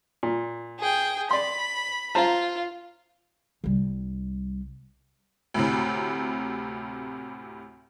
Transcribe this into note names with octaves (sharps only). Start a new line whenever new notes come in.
A#2
G#4 G5
D5 B5 C6
F4 C5 A5 A#5
C2 G3
D2 A2 C3